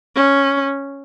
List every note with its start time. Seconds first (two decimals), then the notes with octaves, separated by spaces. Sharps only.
0.16 C#4